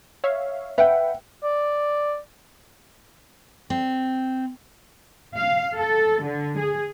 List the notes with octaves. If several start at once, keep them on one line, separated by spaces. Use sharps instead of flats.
C#5 E5 F5
B4 E5 F#5 G5
D5
C4
F5
A4
D3
G#4